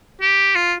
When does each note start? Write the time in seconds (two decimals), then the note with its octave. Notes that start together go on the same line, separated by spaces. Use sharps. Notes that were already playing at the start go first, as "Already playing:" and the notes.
0.21 G4
0.56 F4